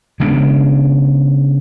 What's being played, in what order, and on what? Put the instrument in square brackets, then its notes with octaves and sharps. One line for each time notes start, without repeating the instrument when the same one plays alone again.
[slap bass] C#3 G#3 B3 D4